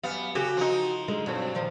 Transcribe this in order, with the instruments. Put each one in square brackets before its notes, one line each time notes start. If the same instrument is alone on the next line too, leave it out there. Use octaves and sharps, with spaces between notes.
[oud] F#2 G3 F5 [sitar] B3
[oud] C#3 F#4 A4 [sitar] G4
[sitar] F3 D#4
[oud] D3 G#3 A#4
[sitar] G2 [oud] B2 F#3 C4
[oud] A#2 D#3 F3